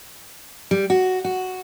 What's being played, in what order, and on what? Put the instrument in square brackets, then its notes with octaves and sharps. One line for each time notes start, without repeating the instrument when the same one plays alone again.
[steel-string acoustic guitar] G3
F#4
F#4